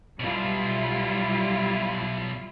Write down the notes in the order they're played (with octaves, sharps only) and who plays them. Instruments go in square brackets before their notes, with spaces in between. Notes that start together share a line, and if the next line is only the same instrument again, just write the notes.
[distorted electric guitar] B1 B2 [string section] G3 E4 F4